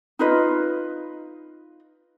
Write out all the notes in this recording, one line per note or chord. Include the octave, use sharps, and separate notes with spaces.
D#4 F4 B4 D#5